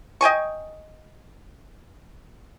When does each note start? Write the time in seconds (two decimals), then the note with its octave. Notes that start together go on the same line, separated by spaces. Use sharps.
0.21 D#5 G5 G#5 C#6